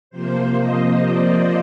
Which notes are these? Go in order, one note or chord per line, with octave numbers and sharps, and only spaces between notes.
C3 F3 A#3 C5
D#5
D5